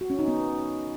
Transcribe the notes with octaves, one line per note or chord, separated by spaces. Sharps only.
F#4
C#4
D#4
B3